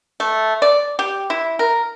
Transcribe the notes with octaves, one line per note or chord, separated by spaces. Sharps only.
A3
D5
G4
E4
A#4